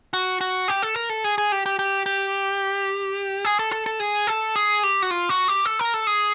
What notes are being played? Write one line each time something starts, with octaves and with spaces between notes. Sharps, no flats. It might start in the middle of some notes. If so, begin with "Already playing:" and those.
F#4
F#4
G4
A4
A#4
A4
G#4
G#4
G4
G4
G4
G4
G#4
A4
A4
A4
G#4
A4
G#4
G4
F#4
F4
F#4
G4
A4
A#4
A4
G#4